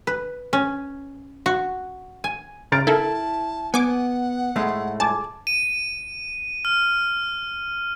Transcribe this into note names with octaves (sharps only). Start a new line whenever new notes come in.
B4
C#4
F#4
G#5
C#3 A#5 F6 A6 D7
E4 A4 A#4 A5
B3 F#5 G#5 D6
A2 G#3 A3
G#5 A5 D6
D#7
F6